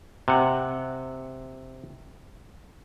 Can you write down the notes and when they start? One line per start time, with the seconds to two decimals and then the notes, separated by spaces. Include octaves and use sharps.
0.28 C3 F#5